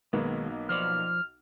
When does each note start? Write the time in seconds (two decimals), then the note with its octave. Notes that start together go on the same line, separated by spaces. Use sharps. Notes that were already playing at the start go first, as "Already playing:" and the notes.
0.13 B1 D#3 G#3 A#3 B3
0.69 F3 C5 D5 F6